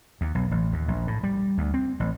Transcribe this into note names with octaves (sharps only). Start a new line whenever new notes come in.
D#2
B1
A1
D#2
A#1
A2
G3
D2
C4
A1